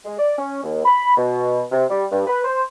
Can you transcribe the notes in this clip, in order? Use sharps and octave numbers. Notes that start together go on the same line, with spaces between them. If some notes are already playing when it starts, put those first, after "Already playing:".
G#3
D5
C#4
D#2
B5
B2
C3
G3
G2
B4
C5